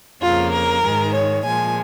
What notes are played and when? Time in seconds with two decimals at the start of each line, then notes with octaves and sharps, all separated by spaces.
0.22 F2 C#3 A#3 F4
0.53 A#4
0.83 G#2 D#3 G#3
1.14 C#5
1.44 A#2 F3 G#3 G#5